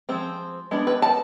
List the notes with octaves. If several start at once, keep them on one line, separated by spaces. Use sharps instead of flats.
F3 G#3 C4
G#3 B3 D4
B4
A5